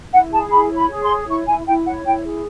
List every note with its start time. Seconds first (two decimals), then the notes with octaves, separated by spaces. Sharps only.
0.12 E4 F#5
0.31 G#4 A5
0.51 E4 B5
0.70 C#5
0.76 B5
0.89 G#4
1.02 C6
1.08 C#5
1.27 E4 C#6
1.47 E4 G#5
1.66 E4 G5
1.85 C#5 F#5
2.05 E4 G5
2.24 G#4